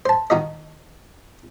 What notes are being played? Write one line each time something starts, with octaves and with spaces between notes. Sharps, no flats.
C5 A5
D#3 D#4 F#4 D#5